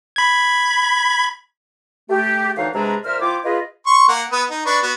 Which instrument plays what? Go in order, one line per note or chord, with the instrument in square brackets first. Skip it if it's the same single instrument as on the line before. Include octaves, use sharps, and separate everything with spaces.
[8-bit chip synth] B5 G#6
[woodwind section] A3 G4
D2 E3 D#4 C#5 F5
C3 G#3 D4 G#4 B4 A#5
A#2 A#4 C5 E5 F6
F3 E4 F4 G5 D6
F4 G#4 B4 D#5
[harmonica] C6 C#6
A#3 F#5
B3 B4 D#6
D#4
D4 B4 C#6
B3 F#4